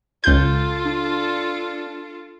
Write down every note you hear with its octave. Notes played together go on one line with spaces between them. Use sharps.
C#2 F4 A4 G6
D4